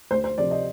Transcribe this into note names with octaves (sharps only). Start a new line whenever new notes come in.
D2 C5
C5
C3 F3 D5
D#5